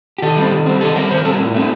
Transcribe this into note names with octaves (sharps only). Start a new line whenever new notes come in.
G4
D#3 A4
G3 C4
D#3
G3 C4
D#3 A4
G3 C4 A#4
D#3 C5
A#4
G3 C4 A4
A#4
A2
A3 C4 D#4